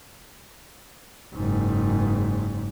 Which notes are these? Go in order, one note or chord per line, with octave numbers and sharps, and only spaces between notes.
F#1 G#2